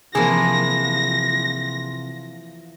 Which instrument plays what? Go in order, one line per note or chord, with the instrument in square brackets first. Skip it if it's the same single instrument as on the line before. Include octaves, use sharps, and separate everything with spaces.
[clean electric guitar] C3 [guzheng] E3 F3 [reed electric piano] A#3 G#4 [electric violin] A#6